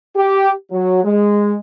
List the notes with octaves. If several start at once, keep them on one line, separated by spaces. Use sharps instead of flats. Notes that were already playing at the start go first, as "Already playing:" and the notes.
G4
F#3
G#3